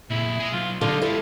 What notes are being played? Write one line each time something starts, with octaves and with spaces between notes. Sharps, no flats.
A#2 G#3 E4
G#4 D#5
B1 F4
D3 G#3 D#4 F4
G#3 E4 G4 A4